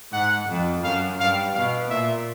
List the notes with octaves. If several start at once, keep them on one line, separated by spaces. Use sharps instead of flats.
G#2 F#5
F2
F#2 F5
G2 F5
B2 F5
A#2 E5